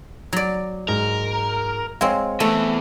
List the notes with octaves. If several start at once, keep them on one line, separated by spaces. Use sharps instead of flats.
F#3 D5
G#2 A#4
G#3 C4 C#5 F5
E2 E3 A3